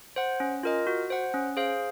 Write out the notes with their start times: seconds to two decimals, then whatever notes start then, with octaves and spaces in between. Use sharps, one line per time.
0.16 C5 F#5
0.40 C#4
0.63 F4 A#4 D#5
0.87 F#4
1.10 C5 F#5
1.34 C#4
1.57 G#4 C5 F5